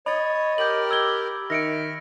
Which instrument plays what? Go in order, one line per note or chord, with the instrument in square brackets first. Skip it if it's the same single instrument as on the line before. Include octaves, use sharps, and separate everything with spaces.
[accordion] C#5 [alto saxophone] D#5 [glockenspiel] B5 A6
[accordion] G4 A#4 G5 [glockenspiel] G6 F#7
[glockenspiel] E6 G#6 G7
[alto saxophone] D#3 [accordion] E5 F6 [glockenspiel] A#6 C#7 D7